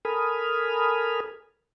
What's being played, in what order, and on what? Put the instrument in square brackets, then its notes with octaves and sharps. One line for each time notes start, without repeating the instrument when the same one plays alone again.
[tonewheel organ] A4 A#4 G#5 B5 D#6 F6